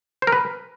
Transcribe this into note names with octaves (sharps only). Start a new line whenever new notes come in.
C5
A#4
B4